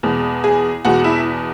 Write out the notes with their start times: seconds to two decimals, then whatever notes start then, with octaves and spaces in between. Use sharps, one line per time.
0.03 E2 B2 G#3
0.44 G#4
0.85 E2 B2 G#3 F#4
1.04 E4